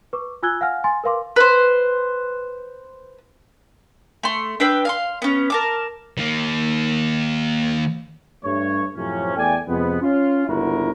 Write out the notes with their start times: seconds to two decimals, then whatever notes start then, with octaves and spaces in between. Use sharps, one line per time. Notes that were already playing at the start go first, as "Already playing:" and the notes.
0.13 B4 C#6 D6
0.43 F4 G#5 E6 F#6 G#6 G7
0.61 F5 F#5 G#5 F6 A#6
0.84 G#5 C6 A6
1.04 A#4 B4 F5 C6 D6
1.36 B4 C5
4.23 A3 C6
4.60 D4 B4 G5 E6
4.85 F5 G#5 C6
5.22 B3 C#4
5.50 A#4 A5 D6
6.18 D#3 A#3
8.44 G2 A3 C#5
8.95 F#2 A2 C3 F3 C#4
9.36 E2 A3 D5 G5 G#5
9.68 F2 C3 G#3 B3
10.01 C#4 F4
10.48 G1 C#2 D3 E4 F#4 A#4